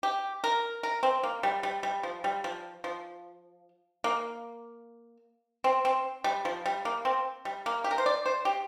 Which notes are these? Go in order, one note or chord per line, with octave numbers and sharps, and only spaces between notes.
G4
A#4
A#4
C4
A#3
G3
G3
G3
F3
G3
F3
F3
A#3
C4
C4
G3
F3
G3
A#3
C4
G3
A#3
G4
A#4
C5
D5
C5
G4